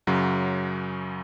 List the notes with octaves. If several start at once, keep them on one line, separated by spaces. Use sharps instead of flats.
F#2 C#3 F#3